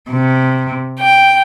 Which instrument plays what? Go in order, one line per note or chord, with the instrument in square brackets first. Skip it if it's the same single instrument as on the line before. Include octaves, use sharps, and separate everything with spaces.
[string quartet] C3
G5